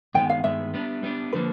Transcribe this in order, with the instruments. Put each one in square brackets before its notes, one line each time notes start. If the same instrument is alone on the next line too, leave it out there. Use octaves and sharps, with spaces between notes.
[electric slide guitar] G2 D#3 G#3 B3 [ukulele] G5
[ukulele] F5
[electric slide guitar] G2 D#3 G#3 B3 [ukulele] E5
[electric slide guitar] G3 B3 D4
G3 B3 D4
[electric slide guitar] D3 F3 A#3 [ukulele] B4